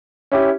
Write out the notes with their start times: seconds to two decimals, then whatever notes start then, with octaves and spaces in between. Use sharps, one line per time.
0.32 C#4 E4 G4